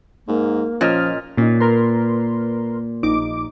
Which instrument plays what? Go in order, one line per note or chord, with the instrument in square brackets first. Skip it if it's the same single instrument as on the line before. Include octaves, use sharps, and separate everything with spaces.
[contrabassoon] G#2 [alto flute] A#3
[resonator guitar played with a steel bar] A#2 [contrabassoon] F3 [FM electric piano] C#4 D#5 F6
[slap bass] A#2 [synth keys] C#4 D#4
[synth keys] A#4 B4 C6
A#1 D#4 D6